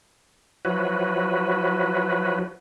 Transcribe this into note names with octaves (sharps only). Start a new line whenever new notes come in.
F3 F#3 E4 F#4 B4